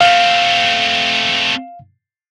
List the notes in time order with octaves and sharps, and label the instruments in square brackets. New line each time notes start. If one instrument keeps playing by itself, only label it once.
[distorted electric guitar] A3 C4 [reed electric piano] F5